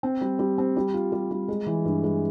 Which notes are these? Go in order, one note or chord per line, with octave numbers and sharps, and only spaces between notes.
C4
G3
G3
C4
G3
F4
G3
G3
G#3
E3
G2
G#3